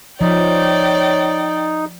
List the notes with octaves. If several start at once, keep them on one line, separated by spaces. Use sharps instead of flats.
F3 D#4 C#5 D5 G5